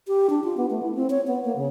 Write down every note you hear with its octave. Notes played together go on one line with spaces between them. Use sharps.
G4
D4
F4
B3
A3
E4
C4
C#5
B3
A#3
C#3